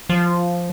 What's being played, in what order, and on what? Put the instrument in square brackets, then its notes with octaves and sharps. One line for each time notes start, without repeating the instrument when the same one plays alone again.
[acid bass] F3